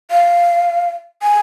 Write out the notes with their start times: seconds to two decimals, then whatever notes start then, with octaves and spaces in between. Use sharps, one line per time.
0.11 F5
1.22 G#5